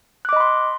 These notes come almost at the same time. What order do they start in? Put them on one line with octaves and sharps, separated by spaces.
F#6 D6 D#5 B5 C6